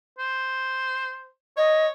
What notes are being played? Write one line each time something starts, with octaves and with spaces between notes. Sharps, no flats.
C5
C#5 D#5